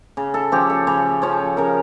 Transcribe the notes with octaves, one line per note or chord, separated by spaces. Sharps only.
C#3
A4
F3 C#4 G4
A4
C#3 C#5
F3 C#4 C#5
C#3 A#4